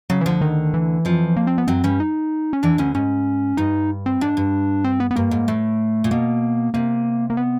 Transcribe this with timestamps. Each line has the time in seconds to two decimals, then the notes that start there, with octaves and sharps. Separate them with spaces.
0.10 C#3 F#3
0.21 E3
0.26 D2 D3 F3
0.41 D#3
0.74 E3
1.05 F2 F3
1.37 A#3
1.47 C4
1.58 B3
1.67 F#2 F#3 C4
1.84 G2 G3 C#4
2.00 D#4
2.53 C#4
2.63 E2 E3 D4
2.78 D2 D3 C#4
2.95 G#2 C#4
3.57 G2 D#4
4.06 C4
4.21 G#2 D4
4.37 G2
4.84 C4
5.00 B3
5.11 B3
5.16 G2 A#3
5.31 G#2
5.48 A2 A3
6.04 A#2
6.11 B2 A#3
6.74 C3 A#3
7.30 A#3
7.37 B3